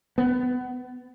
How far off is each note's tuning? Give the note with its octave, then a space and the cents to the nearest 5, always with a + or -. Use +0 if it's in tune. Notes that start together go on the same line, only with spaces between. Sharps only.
B3 +25